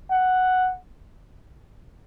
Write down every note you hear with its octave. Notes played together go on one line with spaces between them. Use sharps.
F#5